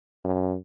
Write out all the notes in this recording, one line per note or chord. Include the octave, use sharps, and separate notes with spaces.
F#2